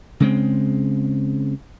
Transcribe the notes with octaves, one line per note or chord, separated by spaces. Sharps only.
C#3 G#3 C4